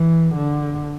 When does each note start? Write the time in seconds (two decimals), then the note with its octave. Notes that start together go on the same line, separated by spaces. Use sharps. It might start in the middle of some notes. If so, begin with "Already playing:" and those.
Already playing: E3
0.35 D3